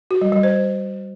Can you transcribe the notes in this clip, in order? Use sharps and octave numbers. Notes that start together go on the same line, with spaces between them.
F#4
G3
G3
C5